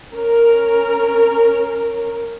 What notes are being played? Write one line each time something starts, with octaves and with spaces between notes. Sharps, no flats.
C#4 A#4